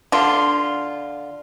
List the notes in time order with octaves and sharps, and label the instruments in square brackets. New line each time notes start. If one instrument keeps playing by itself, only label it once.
[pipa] D3 F4